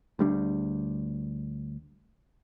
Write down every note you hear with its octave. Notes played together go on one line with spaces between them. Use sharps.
D2 G3 D4